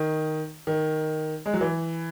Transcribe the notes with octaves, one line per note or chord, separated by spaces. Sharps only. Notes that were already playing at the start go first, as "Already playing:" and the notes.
Already playing: D#3
D#3
G#3
F#3
E3